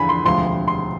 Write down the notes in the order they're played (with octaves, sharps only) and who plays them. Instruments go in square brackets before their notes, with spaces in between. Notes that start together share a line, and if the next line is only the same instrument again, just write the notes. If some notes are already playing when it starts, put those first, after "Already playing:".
Already playing: [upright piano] E2 D3 F3 G#5 B5
C6
E1 D2 C3 F3 C6
C6